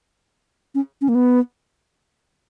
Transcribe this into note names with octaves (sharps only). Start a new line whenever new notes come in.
C#4
C#4
A#3
B3